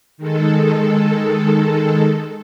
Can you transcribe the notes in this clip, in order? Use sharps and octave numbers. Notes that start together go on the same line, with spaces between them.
D#3 G#3 A4